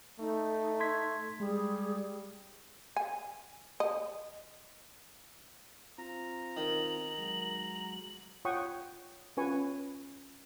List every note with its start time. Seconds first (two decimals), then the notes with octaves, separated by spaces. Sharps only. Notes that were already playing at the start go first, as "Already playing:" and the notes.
0.19 A3 D#4
0.80 C6 G#6 B6
1.40 G3 G#3 G#4
2.96 G#5
3.80 D#5
5.98 C4 F4 A#5
6.57 D#3 F#7
7.18 F#3 G#3
8.45 F4 C#5 F#5 G5 C#6 D#6
9.37 C#4 F4 B4 G#5 C#6